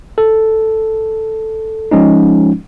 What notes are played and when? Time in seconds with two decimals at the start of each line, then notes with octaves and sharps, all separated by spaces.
0.18 A4
1.91 F3 G#3 C#4 D#4